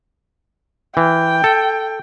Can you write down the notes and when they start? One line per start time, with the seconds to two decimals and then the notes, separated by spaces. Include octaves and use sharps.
0.97 E3 G5
1.44 A4